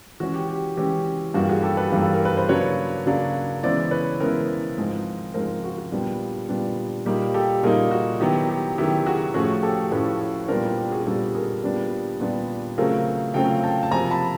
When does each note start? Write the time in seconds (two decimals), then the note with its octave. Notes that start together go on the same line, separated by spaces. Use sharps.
0.20 E3 G#3 C#4 F#4
0.34 G4
0.49 G4
0.77 E3 G#3 C#4 G4
1.34 G2 E3 G3 A#3 F#4
1.49 F#4 G#4
1.63 G4 A4
1.77 A4 B4
1.92 G2 E3 G3 A#3
2.02 A4
2.14 A#4
2.25 B4
2.37 C5
2.49 C#3 F#3 A#3 D4 B4 C#5
3.06 C#3 F#3 A#3 D4
3.63 C#3 E3 G#3 B3 E4 C5 D5
3.91 B4 C#5
4.20 C#3 E3 G#3 B3 E4 A#4 C5
4.78 G#2 F3 G#3 C4
5.34 G#2 F3 G#3 C4 A#4 C5
5.64 F#4
5.78 F#4
5.92 A#2 G3 B3 D4
6.49 A#2 G3 B3 D4
7.06 A#2 G3 A#3 D#4 G4
7.34 G4 A4
7.63 A#2 G3 A#3 D#4 G#4 A#4
7.91 F#4
8.20 D#3 F#3 B3 E4 G4
8.49 G4
8.78 D#3 F#3 B3 E4 G4
9.06 F#4 G#4
9.34 A2 F3 A3 C#4 F#4 G#4
9.63 G4 A4
9.92 A2 F3 A3 C#4 A4 B4
10.48 A#2 G3 B3 D4 A#4 C5
10.64 G4
10.77 G4
10.91 F#4 G#4
11.06 A#2 G3 B3 D4 G4 A4
11.35 G#4 A#4
11.63 A#2 G3 B3 D4
12.20 A#2 G3 B3 D4
12.78 C#3 F#3 A3 C4 F4 G#4 A#4
13.34 C#3 F#3 A3 C4 F4 F5 G5
13.64 G5 A5
13.83 A5
13.92 C3 F3 A#3 G#5 A#5
14.10 A5 B5